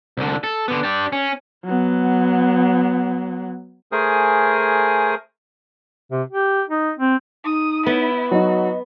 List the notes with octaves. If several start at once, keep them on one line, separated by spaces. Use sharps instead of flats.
C2 D3
A4
D3 B3
D4 G4
C#4
F#3 B3
A3 G#4 A#4 C5 G#5 D#6
C3
G4
D#4
C4
D#4 D#6
B3 E4
F#3 D#4 F#4 D#5